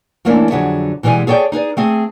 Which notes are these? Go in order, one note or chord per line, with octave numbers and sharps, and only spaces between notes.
E3 A3 A#3 C#4 D4 E4
F2 D3 F#3 G#4 C#5 E5
B2 E3 G3 G#3 E4 G#5
G#4 A4 C#5 D5 G5
D#4 G#4 B4 D5
A3 C4 G#4